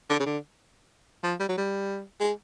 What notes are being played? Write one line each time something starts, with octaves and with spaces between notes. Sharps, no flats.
D3
C#3
D3
F3
G3
F#3
G3
G#3